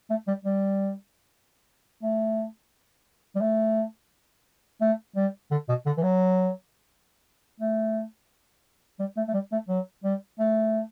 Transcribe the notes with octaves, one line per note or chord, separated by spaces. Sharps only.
A3
G3
G3
A3
G3
A3
A3
G3
D3
B2
D3
E3
F#3
A3
G3
A3
A3
G3
A3
F#3
G3
A3